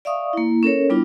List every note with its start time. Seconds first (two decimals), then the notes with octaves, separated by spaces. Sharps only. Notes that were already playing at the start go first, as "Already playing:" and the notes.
0.05 D5 E5 F5 C#6 D#6
0.33 A#3 E4
0.63 C#4 A4 A#4 C#5
0.90 G3 B3 D4 E4 F4